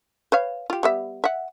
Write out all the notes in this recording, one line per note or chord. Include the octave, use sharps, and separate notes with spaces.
B4 C#5 F5
F4 G4
G3 B3 E5
E5 F#5